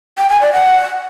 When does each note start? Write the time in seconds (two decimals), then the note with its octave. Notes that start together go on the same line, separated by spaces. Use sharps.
0.18 G5
0.30 G#5
0.41 D5
0.53 F#5